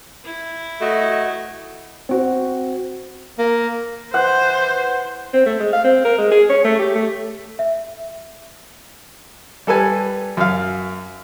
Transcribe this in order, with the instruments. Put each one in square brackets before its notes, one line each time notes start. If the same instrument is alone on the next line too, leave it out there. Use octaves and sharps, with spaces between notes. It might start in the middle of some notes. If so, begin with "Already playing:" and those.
[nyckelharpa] E4
[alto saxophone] A3 [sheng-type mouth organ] F#4 D#5
[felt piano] C4 F#4
[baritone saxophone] A#3
[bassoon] E3 [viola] C5 [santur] F#5
[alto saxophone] C4
A3
G#3
F5
C4
A#4
G#3
G#4
C#5
A3
G4
A3
[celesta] E5
[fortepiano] G3 A4 B4 G#5
F#2 F5